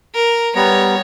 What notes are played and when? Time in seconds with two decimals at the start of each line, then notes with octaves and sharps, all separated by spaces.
0.15 A#4
0.56 G3 B3 C#5 A#5